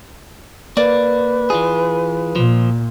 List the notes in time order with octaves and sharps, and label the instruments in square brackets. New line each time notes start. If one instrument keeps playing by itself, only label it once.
[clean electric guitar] A#3 [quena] B4 [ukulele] D5
[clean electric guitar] E3 F4 G#4
[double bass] A#2 [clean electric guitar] F3